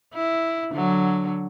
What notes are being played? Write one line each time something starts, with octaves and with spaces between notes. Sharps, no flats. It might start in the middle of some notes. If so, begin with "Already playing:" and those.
E4
D3 F#3